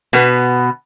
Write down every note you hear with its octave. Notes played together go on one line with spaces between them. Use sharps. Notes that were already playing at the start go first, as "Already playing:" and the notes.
B2 B3